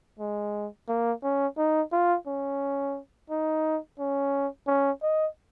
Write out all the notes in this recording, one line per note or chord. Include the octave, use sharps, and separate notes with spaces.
G#3
A#3
C#4
D#4
F4
C#4
D#4
C#4
C#4
D#5